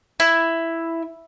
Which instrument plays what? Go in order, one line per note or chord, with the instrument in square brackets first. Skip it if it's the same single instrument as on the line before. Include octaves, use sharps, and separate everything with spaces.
[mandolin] E4